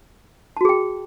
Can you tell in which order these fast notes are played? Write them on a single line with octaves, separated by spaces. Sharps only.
A5 F#4 G#4 G5